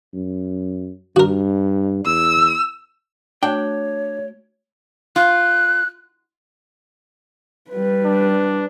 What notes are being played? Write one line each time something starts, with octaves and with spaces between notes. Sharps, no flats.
F#2
G2 F#4 A#4
E2 E6
A3 D4 F#4 C#5 G5
F4 F#6
G3 B4
D4